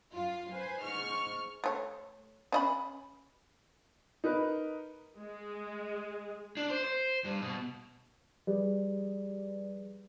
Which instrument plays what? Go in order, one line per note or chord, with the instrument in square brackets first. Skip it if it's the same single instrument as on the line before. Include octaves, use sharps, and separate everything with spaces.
[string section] F#2 F4 F5
B4 C5 G#5
G#2 C#6 F6
[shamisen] A3 C#5
C#4 D#5 B5
[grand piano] D#4 A#4 B4
[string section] G#3
[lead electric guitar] D4
C5
C5
G2
B2
[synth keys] F3 G3 G4 G#4 B4 D5